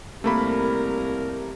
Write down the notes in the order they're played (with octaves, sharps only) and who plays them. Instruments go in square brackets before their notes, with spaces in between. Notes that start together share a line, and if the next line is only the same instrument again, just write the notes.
[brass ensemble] C2 G4 A#4 [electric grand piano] A3 A#3 B5